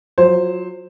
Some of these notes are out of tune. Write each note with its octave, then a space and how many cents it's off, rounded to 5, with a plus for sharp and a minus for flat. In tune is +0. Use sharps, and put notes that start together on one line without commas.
F#3 -20 F4 +0 C5 +0